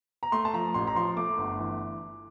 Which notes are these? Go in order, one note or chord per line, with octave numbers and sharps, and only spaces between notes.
A#5
A3 C6
A5
F3 A#5
A1 C6
A#5
F3 C6
A3 D6
G1
E3